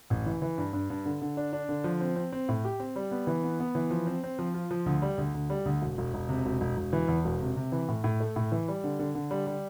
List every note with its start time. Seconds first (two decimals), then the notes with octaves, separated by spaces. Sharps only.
0.10 A1
0.26 E3
0.42 E3
0.58 G2
0.73 G2
0.90 G2
1.06 D3
1.22 D3
1.37 D4
1.53 D4
1.69 D3
1.84 F3
2.01 C4
2.16 C4
2.32 C4
2.49 A2
2.64 G4
2.80 C4
2.96 G3
3.11 B3
3.27 E3
3.44 B3
3.60 B3
3.75 E3
3.91 F3
4.07 C4
4.24 C4
4.39 F3
4.54 F4
4.71 F3
4.86 D2
5.02 G3
5.18 D2
5.34 D2
5.50 G3
5.65 D2
5.82 E1
5.98 E1
6.14 E1
6.29 C3
6.45 E1
6.61 E1
6.77 E1
6.93 E3
7.08 E2
7.25 E1
7.41 C3
7.56 C3
7.72 E3
7.89 A2
8.04 A2
8.20 A3
8.36 A2
8.52 E3
8.68 G3
8.84 D3
8.99 D3
9.15 D3
9.31 G3
9.47 G3